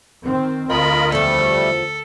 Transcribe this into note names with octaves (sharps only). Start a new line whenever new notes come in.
D#3 C4
D2 F4 A#4 D#5 B5
E2 F3 G3 A3 A4